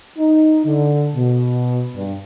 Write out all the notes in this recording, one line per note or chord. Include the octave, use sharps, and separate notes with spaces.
D#4
D3
B2
G2